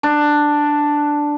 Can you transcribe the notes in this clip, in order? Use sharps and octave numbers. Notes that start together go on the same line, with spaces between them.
D4